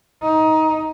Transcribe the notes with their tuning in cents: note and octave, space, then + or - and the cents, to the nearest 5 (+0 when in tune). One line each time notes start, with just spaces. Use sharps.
D#4 +20